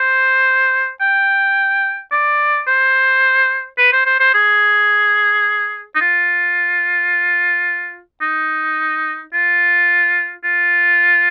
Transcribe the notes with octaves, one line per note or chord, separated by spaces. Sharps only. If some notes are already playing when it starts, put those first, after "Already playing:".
Already playing: C5
G5
D5
C5
B4
C5
C5
C5
G#4
D#4
F4
D#4
F4
F4